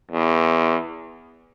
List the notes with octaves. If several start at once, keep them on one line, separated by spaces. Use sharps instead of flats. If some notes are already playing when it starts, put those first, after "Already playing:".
E2